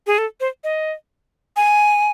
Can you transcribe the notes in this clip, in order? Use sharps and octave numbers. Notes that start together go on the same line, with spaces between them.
G#4
A4
C5
D#5
G#5